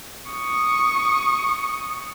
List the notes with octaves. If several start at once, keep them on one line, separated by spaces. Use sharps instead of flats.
C#6 D#6